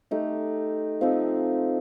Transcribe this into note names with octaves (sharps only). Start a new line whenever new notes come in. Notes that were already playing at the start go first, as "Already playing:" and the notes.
A3 D#4 G4
F3 C4 D#4 A4